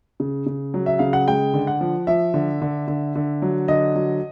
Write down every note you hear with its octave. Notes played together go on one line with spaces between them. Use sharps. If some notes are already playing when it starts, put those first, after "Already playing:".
C#3
C#3
F#3
E5
C#3 F5
F#5
G#3 G5
D3
F#5
F3
F3 E5
D3
D3
D3
D3
F#3
D3 D#5
F#3